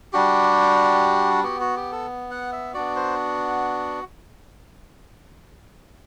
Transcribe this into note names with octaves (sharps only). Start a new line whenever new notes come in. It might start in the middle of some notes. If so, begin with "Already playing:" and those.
G3 D4 F#4 G4
B3 F#4 G4
F#4
G4
A4
F#5
E5
B3 D4 F#4 D5
C5